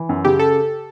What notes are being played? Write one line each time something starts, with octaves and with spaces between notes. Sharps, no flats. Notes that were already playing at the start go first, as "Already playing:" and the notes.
Already playing: E3
F#2
C#3 G4
A4